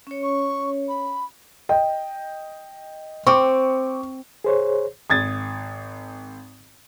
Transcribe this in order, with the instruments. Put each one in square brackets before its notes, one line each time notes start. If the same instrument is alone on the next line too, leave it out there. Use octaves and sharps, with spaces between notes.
[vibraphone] C#4 C#5
[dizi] C#6
B5
[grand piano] D#5 G5
[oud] C4 [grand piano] C#6 D6
[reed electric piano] G#4 C5 C#5
[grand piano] G#1 G#6 A6 [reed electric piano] D#6